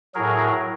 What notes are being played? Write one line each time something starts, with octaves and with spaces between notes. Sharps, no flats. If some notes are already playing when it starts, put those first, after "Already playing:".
A2 F#3 G#4 A#4